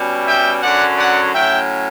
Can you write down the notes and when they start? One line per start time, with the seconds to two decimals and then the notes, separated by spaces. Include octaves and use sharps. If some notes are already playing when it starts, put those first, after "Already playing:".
Already playing: B2 G3 C#4
0.26 E5 G5
0.62 F#2 D3 F#3 C#4 D5 F#5
0.98 D5 F#5
1.34 A2 F#3 C#4 E5 G5